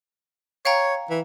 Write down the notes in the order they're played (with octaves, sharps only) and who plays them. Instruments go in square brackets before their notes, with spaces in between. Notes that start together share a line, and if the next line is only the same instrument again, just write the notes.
[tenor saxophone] C#5 [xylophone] F5 G5 A#5
[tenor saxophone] E3